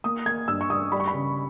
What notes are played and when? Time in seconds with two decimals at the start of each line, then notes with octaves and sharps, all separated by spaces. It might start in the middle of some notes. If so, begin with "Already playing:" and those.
0.04 A#3 D#6
0.26 A#3 G#6
0.48 G2 E6
0.61 C#6
0.70 G2 D#6
0.92 G3 B5
1.00 C#6
1.07 B5
1.14 C#3